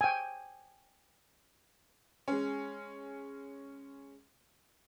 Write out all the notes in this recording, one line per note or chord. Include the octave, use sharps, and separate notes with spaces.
G5 G#5
G#3 C#4